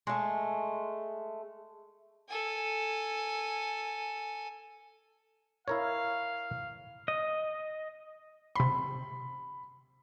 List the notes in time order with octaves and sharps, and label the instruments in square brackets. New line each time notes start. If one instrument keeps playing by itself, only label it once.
[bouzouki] G#3 A3
[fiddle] A4 G#5
[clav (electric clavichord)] E4 A#4 C#5 [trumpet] F5
[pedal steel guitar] D#5
[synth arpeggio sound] C3 C6 [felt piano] B5